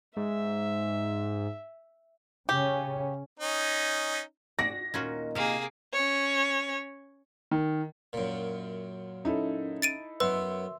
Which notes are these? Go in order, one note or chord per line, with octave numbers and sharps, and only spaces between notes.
G#2 E5
C#3 C#4 G4
C#4 D#4
F#4 D5 A#6
D#2 A#2 C#4 D#4 F4 F#4
C3 A#3 G#4 F5
C#4 C#5
D#3
F#2 A#2
C#4 D#4 E4 A4
A6 D7 D#7
F#2 B3 B4 E5 C6 E6